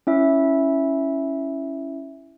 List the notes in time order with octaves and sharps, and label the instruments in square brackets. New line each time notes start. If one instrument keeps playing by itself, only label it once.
[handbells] C#4 E4 E5